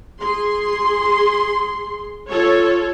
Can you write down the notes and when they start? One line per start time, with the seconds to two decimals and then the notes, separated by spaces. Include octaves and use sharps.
0.20 G#4 C6
2.28 F4 A4 C#5